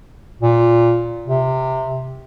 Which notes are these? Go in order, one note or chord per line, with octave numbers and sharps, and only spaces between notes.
A#2
C3